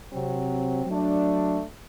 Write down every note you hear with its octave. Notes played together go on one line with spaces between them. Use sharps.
C3 F#3 C4
F#3 A3 D4